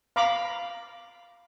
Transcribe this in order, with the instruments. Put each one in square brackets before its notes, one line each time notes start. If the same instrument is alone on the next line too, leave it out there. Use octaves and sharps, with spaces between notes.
[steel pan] F5 A#5 B5 D6